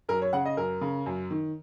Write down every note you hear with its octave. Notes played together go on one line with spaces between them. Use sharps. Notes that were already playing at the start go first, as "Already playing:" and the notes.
F#2 A#4
C#5
C#3 F#5
D#5
F#2 A#4
C#3
F#2
D#3